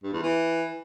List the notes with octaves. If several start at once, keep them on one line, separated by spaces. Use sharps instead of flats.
G2
E2
E3